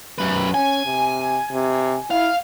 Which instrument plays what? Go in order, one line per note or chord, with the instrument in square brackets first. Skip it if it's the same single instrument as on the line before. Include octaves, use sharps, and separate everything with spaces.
[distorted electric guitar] F#2 B4
[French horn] C#4 [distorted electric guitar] G#5
[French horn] C3
C3
[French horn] E4 [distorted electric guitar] F5